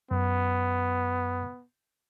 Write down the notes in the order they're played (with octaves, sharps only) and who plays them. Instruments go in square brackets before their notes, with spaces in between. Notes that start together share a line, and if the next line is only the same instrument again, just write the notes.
[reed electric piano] F#2 [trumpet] B3